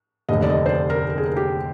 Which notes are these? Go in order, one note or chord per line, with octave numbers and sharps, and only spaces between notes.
F1 D#2 D3 D#5
D5
D#5
C5
D5
A#4
A#4
G#4
A#4
G4